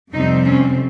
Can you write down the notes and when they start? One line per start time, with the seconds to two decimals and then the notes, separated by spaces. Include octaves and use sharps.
0.14 F2 C3 G3 C4 D#4
0.45 C#4